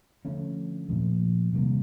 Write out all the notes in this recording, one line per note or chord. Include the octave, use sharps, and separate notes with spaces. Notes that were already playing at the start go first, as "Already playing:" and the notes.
D3 F3 A3 C#4
A#2 F3 A3
C3 D#3 G3 A#3